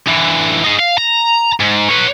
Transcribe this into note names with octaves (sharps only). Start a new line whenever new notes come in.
D3 E3
D#4 G#4
F5
A#5
G#2
B4 C#5